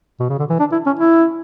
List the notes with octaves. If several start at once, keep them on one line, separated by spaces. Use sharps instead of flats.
B2
C#3
D3
E3
D4
E4
C#4
E4